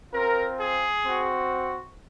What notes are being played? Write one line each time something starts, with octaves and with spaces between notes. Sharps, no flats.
C4 F4 A#4
G#4
C4 F#4